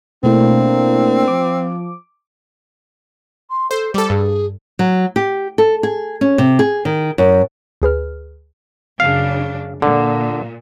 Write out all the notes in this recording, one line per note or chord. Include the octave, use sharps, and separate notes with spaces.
B2 A3 A#3 C4 D4 E4
F3 D6
C6
A4 C5
G3 A4 D6
G2 G#4
F#3
G4
A4
G#4
C#4
C3
G#4
D#3
F#2
D2 G#4 B4 F6
F#2 C#3 D4 F5
A#2 D3